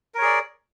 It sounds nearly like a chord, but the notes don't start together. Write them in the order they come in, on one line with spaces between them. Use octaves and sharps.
A#4 C#5 G#4 D5